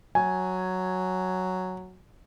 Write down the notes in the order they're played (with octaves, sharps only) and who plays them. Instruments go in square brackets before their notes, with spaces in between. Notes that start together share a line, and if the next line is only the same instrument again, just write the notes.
[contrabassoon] F#3 [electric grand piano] G#5